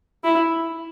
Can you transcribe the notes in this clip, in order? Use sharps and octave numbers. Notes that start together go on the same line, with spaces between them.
E4